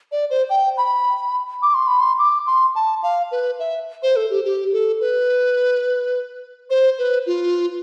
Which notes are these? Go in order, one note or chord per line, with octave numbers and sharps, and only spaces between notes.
D5
C5
G5
B5
D6
C6
B5
C6
D6
C6
A5
F5
B4
E5
C5
A4
G4
G4
A4
B4
C5
B4
F4